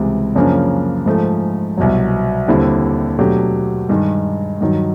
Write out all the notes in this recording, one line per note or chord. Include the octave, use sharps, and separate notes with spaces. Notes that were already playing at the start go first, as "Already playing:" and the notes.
Already playing: C#2 C3 E3 G3
F#2 C#3 F3 A#3 D4
G#2 F3 A3
C2 B2 F#3
D#2 D3 G3 C4 E4
B2 F#3 A3 D4 G4
G2 D#3 G#3
G2 D#3 F#3